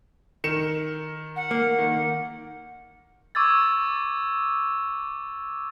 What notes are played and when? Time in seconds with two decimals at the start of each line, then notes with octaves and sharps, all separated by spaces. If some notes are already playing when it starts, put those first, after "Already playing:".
0.44 D#3 C#7 E7
1.36 F#5
1.51 A#3
1.79 D#3
3.35 C#6 D6 E6 G#6 A6